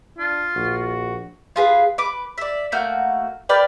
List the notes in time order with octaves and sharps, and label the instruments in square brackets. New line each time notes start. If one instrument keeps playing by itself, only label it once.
[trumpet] D4 [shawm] F4
[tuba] A#1 [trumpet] F#4
[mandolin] F4 G#4 B4
B4 D6
D5 E5
A3 A#3 F#4 G6
A#4 B4 D5 G5